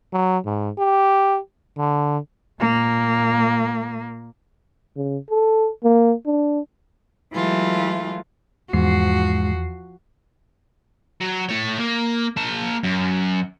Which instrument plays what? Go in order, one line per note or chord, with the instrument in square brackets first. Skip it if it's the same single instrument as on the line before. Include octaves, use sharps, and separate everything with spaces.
[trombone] F#3
G#2
G4
D3
[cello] A#2 A#3
[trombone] C#3
A4
A#3
D4
[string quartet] E3 F#3 G#3 A3 F4
[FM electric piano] E2 C7 [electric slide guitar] G#2 [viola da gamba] F3 F#4
[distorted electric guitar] F#3
A3 C#5
A#3
A#3 A5
F#2